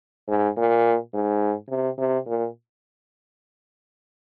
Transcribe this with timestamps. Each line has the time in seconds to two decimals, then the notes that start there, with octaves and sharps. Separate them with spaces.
0.28 G#2
0.57 A#2
1.14 G#2
1.69 C3
1.98 C3
2.26 A#2